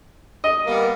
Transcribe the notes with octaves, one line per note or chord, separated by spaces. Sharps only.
D#5
G3 A#3 B3